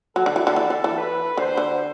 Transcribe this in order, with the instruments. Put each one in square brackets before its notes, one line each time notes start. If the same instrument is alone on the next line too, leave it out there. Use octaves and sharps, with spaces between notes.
[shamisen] F#3 [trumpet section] A4
[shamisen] D3
E3
D3
E3
D3
E3
[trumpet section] B4
[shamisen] D3 [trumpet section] C5
[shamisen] D3